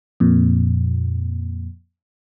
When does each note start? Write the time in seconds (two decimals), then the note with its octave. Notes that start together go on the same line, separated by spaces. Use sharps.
0.20 F2 A#2